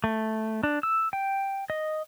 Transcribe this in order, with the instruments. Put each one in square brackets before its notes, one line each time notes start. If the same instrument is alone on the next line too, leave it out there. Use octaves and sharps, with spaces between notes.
[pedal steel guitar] A3
D4
E6
G5
D#5